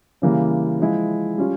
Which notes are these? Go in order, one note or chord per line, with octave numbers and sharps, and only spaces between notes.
C#3 E3 G3 A#3
F3 G#3 E4
G3 C#4 F4